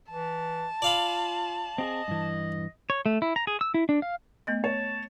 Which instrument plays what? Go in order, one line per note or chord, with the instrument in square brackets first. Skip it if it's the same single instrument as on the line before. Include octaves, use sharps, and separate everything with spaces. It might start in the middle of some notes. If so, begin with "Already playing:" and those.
[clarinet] E3 [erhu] A5
[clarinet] F4 [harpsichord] D5 F5 B5
[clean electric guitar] C4 G4 G#4 [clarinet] D#5
[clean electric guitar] G2 E3
[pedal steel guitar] C#5
A3
E4
A#5
G#4
E6
E4
D4
F5
[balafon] A3 B3 D#5
[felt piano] C#5 [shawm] A5